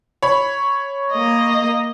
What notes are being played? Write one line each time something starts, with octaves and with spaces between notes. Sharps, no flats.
C#5 B5
A#3 D#5